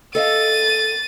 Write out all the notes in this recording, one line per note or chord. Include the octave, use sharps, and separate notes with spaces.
A4 D#5 F5 A6 D#7